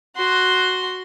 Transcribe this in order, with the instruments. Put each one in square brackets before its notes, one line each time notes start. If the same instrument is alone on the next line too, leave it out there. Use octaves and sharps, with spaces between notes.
[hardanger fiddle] F#4 C6